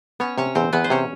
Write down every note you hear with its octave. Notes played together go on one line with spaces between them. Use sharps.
B3 C#4 C#5
C3 C#4 C#5
E2 C4 C5
E2 B3 B4
C5
C3 C#4 C#5